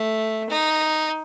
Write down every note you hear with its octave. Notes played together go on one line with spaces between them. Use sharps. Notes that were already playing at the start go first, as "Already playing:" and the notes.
Already playing: A3
D#4